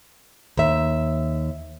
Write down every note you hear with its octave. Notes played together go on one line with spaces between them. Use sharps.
D#2 E5